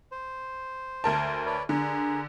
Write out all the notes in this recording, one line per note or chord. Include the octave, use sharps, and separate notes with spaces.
C5
D2 A#4 A5
B4 C#5 D5
D3 G#4 A#4